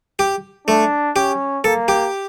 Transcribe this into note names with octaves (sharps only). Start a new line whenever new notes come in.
G4
A3 D4
C#4 G4
A#3 A4
G4